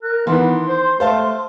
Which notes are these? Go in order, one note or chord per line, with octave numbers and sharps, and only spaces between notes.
A#4 F#6
D#3 E3 B3 C6
C5
A3 C5 F5 A5